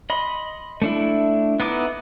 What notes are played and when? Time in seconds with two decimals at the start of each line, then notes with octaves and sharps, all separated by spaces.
0.10 D#5 B5 C6
0.82 A3 D4 E4
1.60 B3 D#4 E4 D6